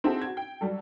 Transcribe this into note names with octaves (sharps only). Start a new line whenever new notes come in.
C4 D#4 E4 F#4 G#4 A4
F#4 G#6
G5
F#3 G3 A4